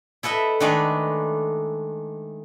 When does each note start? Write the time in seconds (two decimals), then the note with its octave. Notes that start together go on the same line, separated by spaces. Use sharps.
0.23 E4 A4 B4 D#5 E5
0.60 D#3 G#3 A3 D4 A#4 B4